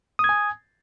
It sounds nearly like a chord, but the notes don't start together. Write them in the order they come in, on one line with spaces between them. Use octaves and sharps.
D#6 G#6 G#5